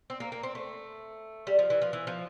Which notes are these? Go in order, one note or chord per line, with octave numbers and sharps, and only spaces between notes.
C4
A#3
A#3
C4
A3
G3
F3
E3
F3
E3
F3